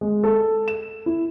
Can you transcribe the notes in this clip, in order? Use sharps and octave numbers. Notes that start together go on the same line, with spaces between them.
G#3
A4
E7
E4